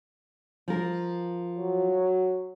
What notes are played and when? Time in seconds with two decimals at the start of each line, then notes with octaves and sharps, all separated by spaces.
0.68 F3 A#4
1.58 F#3